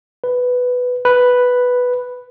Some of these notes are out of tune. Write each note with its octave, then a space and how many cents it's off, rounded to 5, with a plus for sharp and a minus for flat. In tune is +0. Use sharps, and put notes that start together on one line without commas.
B4 +5
B4 +0